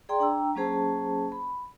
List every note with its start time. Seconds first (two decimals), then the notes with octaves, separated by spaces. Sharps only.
0.09 G#4 D5 G5 A#5 C6
0.20 D4 G5 A#5 E6
0.55 F#3 A#3 C#4 G#4 C5 A5
1.32 B5